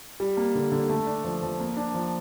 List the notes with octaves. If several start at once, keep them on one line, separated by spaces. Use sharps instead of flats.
G3
A#3
D3
D3
A3
D4
F3
F3
A#3
D4
F3